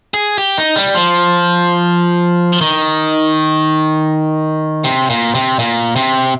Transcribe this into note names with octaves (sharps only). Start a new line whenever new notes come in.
G#4
G4
D#4
G3
F3
D#3
C3
A#2
C3
A#2
C3